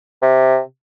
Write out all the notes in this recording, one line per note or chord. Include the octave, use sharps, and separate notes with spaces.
C3